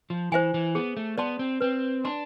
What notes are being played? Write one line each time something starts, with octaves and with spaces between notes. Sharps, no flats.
F3
E3 C5 E5 G#5
E3
B3 G#4
A3
B3 D5 A5 C6
C4
C4 B4
D4 D5 A5 C6